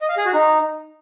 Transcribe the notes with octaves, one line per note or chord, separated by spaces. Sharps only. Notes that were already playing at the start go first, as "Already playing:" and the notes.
D#5
F5
G#4
F#4
D#4